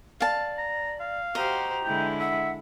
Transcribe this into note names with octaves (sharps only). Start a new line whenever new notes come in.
D5 F5 A5
A#5
F5
F#4 G4 C5 D#5 A#5
D3 G#3 E4 G5
E5 F#5